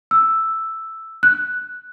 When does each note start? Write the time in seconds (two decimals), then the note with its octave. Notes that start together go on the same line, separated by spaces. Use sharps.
0.11 E6
1.23 F#6